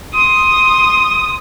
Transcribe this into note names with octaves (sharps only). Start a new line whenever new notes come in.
C6 D#6